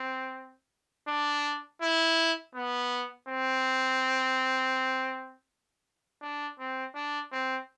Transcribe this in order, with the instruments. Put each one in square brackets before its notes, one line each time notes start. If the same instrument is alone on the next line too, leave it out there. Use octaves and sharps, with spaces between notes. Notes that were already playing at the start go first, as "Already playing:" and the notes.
Already playing: [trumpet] C4
D4
E4
B3
C4
D4
C4
D4
C4